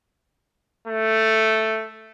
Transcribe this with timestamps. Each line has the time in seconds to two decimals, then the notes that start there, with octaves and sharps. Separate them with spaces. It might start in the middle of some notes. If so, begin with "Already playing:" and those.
0.88 A3